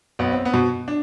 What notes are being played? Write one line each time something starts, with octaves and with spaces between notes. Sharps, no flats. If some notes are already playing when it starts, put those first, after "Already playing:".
B1 B3
C4
B3
B2
D4